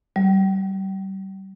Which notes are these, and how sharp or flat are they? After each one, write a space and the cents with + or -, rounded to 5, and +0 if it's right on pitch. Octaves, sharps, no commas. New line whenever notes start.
G3 -30